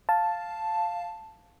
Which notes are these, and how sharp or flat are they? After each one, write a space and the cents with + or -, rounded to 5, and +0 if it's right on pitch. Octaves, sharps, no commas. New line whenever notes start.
F5 +0 A5 +0